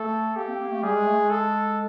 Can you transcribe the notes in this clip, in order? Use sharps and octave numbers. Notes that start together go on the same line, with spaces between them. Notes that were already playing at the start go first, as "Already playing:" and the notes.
Already playing: A3 A4
A#3 G4
C4
A#3
A3
G3 G#4
G#3
A3
G#3
A4